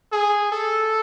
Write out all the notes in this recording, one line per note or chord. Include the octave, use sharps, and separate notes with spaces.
G#4
A4